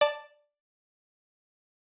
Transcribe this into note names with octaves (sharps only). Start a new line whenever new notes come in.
D5 A5